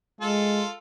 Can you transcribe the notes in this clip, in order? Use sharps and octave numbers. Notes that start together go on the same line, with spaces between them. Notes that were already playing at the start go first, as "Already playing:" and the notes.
G#3 F4 A4